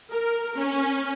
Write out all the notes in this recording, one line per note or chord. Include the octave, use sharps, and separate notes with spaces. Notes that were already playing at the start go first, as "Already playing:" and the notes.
A#4
C#4